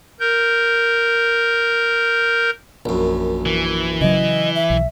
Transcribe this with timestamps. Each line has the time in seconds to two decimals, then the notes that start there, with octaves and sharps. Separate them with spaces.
0.20 A#4 G6
2.86 A#1 F#2
3.46 E3
4.01 C#3 F#3 D#5
4.55 E5
4.70 B1